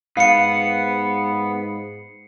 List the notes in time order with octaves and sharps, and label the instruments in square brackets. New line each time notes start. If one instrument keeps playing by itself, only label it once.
[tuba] G#2 [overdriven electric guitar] B3 [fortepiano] F5 [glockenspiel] C7 C#7